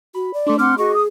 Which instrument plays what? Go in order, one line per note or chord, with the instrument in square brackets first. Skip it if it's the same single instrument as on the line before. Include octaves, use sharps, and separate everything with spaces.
[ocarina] F#4 [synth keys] B5
[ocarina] D5
[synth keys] A3 D4 [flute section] A4 C6 D6
[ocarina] C4 [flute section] F#5 C6 F6 [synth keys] D6
[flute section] F#4 D#5 C#6 [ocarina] G#4
[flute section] D#6